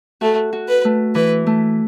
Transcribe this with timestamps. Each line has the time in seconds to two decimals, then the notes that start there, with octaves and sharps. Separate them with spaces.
0.21 A3 F#4
0.53 F#4
0.68 B4
0.85 A3
1.15 E3 B4
1.47 A3